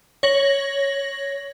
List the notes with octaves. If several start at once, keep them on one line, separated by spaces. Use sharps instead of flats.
C#5 A#6 F#7